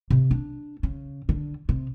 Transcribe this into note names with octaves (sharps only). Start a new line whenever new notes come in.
C3
D4
C#3
D3
C3